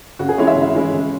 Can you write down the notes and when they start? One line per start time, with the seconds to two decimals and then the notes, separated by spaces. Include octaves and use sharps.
0.19 C#3 F#4
0.29 G#4
0.38 E3 G#3 C#4 E4 C#5
0.47 E5
0.56 C#3
0.75 E3 G#3 C#4 E4
0.93 C#3